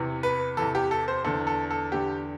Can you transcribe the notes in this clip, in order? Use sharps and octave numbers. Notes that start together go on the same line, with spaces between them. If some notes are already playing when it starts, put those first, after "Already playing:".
Already playing: E2 C3 E3
B4
E2 C3 E3 A4
G4
A4
C5
E2 D3 A4
A4
A4
E2 D3 G4